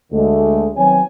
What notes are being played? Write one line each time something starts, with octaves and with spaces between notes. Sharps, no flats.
D2 D3 G#3 A3
D#3 F#3 B3 C4 C#5 G#5